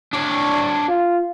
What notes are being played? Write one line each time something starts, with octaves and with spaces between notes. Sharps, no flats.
D4 C#5
F4